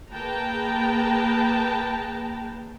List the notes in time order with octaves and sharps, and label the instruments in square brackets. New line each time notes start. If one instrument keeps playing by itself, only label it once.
[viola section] A#3 G#4 B4 G5 A5 A#5